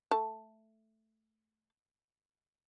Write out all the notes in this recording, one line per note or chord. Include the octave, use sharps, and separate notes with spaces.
A3 A5